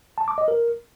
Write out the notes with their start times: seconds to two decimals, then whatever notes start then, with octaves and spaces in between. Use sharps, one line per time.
0.18 A5
0.28 D6
0.38 D#5
0.48 A#4